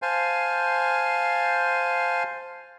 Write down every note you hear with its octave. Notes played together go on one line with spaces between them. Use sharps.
C5 F5 G#5 A5